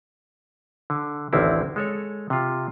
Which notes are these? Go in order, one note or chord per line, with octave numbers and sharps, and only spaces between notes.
D3
A1 D2 D3 D#3 C4 E4
G#3 A4 C#5
C3 F4